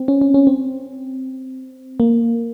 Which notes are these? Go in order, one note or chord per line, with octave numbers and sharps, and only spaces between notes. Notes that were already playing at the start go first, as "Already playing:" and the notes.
Already playing: C4
C#4
C#4
C#4
C4
A#3